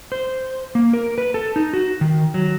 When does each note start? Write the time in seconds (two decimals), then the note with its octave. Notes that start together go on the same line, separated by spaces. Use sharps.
0.12 C5
0.75 A#3
0.93 A#4
1.18 B4
1.34 A4
1.56 D#4
1.73 F#4
2.01 D#3
2.34 F#3